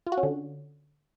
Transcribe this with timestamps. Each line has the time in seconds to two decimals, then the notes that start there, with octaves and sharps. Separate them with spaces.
0.07 F4
0.12 F#4
0.18 C#4
0.23 D3